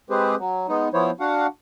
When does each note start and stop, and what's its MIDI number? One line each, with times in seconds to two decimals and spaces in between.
0.10 0.35 56
0.10 0.35 60
0.10 0.35 67
0.10 0.35 68
0.10 0.35 71
0.10 0.35 72
0.39 0.67 54
0.68 0.88 56
0.68 0.88 59
0.68 0.88 63
0.93 1.11 53
0.93 1.11 59
0.93 1.11 64
0.93 1.11 72
0.93 1.11 73
1.20 1.47 62
1.20 1.47 66
1.20 1.47 77
1.20 1.47 78